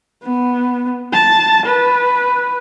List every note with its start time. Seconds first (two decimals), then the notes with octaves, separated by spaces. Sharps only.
0.23 B3
1.13 A5
1.66 B4